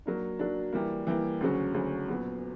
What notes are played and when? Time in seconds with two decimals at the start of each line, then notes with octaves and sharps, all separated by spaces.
0.06 F#3 A#3 D4
0.39 F#3 A#3 D4
0.73 E3 G3 A#3
1.07 E3 G3 A#3
1.40 D2 C#3 F#3 C#4
1.74 D2 C#3 F#3 C#4
2.08 A#2 F#3 B3